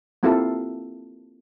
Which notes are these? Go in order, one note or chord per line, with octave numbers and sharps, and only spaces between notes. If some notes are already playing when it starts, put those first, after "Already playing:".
A#3 C4 E4 F4 G4 A4